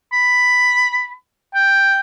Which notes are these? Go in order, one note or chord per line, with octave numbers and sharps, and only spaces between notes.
B5
G5